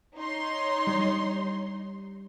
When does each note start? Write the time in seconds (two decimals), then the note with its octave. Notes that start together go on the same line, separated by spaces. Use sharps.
0.17 D#4 C#5 C6
0.87 G3